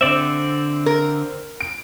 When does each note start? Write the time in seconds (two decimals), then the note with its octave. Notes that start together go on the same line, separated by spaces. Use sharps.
0.01 D3 C4 D5 E5
0.86 A#4
1.61 D7